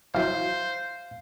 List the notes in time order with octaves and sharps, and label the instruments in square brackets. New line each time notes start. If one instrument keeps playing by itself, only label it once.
[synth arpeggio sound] E3 F#3 E4 [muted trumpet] C5 [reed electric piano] F5